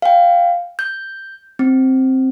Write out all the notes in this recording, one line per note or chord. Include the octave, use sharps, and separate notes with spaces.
F5 G5
G6
C4